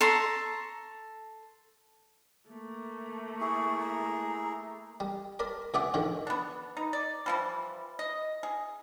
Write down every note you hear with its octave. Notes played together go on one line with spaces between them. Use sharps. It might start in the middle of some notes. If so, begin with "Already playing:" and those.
A4 A#5 C6 C#6
A3 A#3
E4 G#4 C#6
A#5
G3
A#4 D5 A5 B5
C#2 G#4 D5 E5 F#5 D6
G#2 D3 D#3 F3
B3 D4
D#4
D5
E3 F3 G3
D#5
G#4